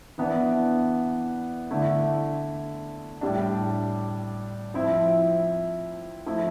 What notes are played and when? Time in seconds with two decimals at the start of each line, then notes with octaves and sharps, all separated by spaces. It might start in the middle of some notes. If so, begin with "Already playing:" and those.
0.18 E3 B3 D4
1.71 D3 A3 E4
3.21 A2 G3 D4
4.74 F3 C4 E4
6.26 F3 A3 E4